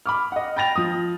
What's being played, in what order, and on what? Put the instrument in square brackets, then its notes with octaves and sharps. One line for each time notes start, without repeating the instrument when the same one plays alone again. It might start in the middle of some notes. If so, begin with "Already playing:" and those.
[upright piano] B5 D6 F6
D#5 F#5
G5 B5 A6 A#6 F7
F3 D#6